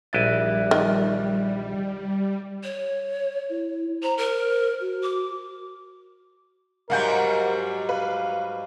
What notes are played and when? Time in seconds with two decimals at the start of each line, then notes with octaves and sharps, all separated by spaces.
0.13 A#1 G3 E4 D#5 E5 F#6 A6
0.71 D#3
2.63 C#5
3.50 E4
4.03 C5 A#5
4.18 A#4
4.81 F#4
5.03 D6
6.90 G#2 F#3 G3 A#4 F5 F#5 G6
7.89 B4 F5